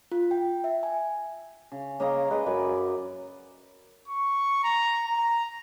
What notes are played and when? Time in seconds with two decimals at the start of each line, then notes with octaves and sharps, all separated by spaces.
0.12 F4
0.31 G5
0.64 E5
0.83 G#5
1.72 C#3
2.00 C#3 A#3 D#5 A#5
2.31 G#3 B4
2.46 F#2 D5 G#5 B5
4.08 C#6
4.64 A#5
5.06 A#5